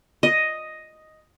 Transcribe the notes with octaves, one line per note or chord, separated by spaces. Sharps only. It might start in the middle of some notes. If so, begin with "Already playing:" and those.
D#5